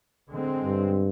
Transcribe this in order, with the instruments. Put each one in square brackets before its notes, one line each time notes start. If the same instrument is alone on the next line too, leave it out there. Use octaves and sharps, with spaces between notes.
[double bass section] D3 G#3 C4
[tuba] G2